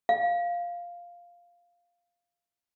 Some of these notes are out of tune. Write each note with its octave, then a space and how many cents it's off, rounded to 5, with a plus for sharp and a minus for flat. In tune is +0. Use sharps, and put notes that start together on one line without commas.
F5 +0